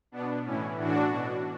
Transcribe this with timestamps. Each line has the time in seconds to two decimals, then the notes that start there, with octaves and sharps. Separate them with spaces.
0.12 B2 B3 D4
0.44 A2 E3 C#4 E4
0.77 A2 E3 D4 F#4
1.11 B2